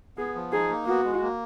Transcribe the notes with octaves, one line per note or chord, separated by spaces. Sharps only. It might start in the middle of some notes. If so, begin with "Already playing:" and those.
B3 G#4
F3
D#4 G#4
A#3
B3 F#4
G#3
A#3